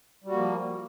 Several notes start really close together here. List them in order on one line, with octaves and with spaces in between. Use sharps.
G3 F#4 A#3 F3